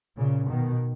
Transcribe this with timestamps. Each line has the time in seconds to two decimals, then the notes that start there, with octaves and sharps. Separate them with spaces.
0.17 A#2 C#3
0.48 B2 D#3